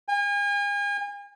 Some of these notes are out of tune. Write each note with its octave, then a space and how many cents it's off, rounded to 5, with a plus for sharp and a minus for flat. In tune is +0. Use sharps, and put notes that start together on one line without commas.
G#5 -40